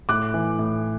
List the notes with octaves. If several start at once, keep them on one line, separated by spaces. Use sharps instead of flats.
A2 D6 F#6
E3
A2